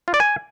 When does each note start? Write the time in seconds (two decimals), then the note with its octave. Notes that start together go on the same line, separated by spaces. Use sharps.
0.08 F4
0.14 D5
0.20 G#5